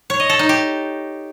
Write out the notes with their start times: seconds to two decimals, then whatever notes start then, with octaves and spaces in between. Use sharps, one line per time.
0.10 C#5
0.20 D#5
0.29 A4
0.39 D#4
0.49 G4